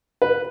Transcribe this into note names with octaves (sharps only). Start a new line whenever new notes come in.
B4